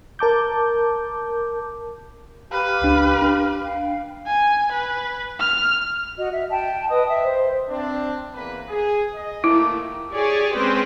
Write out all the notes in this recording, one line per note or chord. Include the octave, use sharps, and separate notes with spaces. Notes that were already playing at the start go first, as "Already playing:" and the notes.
A#4 A5 D6 G6
G4 B4 F5 F6
C#2 D4
D4
F5 G5
G#5
B4
F6
F#4 D#5
E5
G5 A5
B4 D#5 D#6
E5
C5
C4 D4
E2 A#3 B4
G#4
D#5
A#2 D#3 A3 E4
G4 G#4 C#5 D5 G#5
G#3 C4 C#4 B4 C5 G5